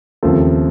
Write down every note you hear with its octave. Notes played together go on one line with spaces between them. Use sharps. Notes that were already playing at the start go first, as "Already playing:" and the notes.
D#2 C#3 F3 A3 C4 A4